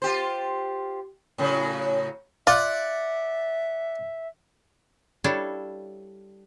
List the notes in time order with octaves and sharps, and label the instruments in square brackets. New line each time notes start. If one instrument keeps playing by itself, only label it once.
[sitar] F4 G4 C5
A2 C#3 F#3
[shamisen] F4 [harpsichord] D5 F#5 [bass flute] E5
[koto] G3 D4 E4 A4 C#5 F5